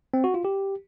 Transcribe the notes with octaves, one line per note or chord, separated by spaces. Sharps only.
C4
F#4
F4
G4